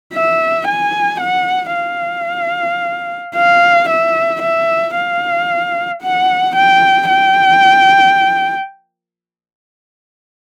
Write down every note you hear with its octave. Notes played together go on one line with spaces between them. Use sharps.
E5
G#5
F#5
F5
F5
E5
E5
F5
F#5
G5
G5